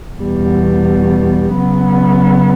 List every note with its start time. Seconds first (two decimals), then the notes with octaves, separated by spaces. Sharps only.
0.18 E2 B2 G3
1.54 C#3 F#3 B3